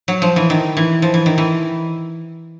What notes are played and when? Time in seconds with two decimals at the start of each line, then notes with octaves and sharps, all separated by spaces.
0.08 F#3
0.22 F3
0.36 E3
0.50 D#3
0.77 E3
1.02 F3
1.14 E3
1.26 D#3
1.38 E3